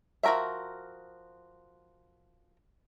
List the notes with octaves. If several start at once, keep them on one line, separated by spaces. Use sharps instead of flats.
F3 F#4 A#4 C#5 E5